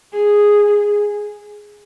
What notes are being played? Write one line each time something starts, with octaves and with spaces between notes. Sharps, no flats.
G#4